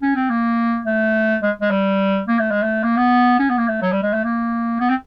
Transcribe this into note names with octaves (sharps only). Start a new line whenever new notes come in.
C#4
C4
A#3
A3
G#3
G#3
G3
A#3
A3
G#3
A3
A#3
B3
C#4
B3
A#3
A3
F#3
G3
G#3
A3
A#3
B3
C4